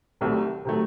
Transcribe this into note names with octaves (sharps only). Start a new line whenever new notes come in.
C2 C3 D#3 F#3 A3
C3 D#3 F#3 A3